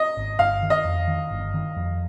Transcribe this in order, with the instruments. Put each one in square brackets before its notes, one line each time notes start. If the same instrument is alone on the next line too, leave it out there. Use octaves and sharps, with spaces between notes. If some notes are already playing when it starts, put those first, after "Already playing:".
Already playing: [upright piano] D#5
[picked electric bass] G#1
[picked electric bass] G1 [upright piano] F5
[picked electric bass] D#3
[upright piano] D#5
[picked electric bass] F2
D#3
G1
D#3
F2